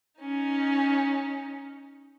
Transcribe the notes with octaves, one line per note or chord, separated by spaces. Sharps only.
C#4 D#4